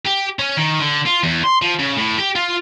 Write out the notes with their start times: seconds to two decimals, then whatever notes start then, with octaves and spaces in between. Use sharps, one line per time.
0.06 G4
0.39 C#4
0.57 D#3
0.80 D3
1.06 F4
1.23 E2
1.44 C6
1.62 F3
1.79 C#3
1.97 A2
2.18 G4
2.36 F4